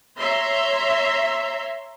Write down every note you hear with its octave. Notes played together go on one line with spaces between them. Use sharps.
C#5 E5 A#5 C6